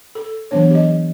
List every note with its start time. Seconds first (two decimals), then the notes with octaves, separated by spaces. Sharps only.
0.15 A4
0.51 E3 F#3 B3 D4 C#5
0.70 G4 D#5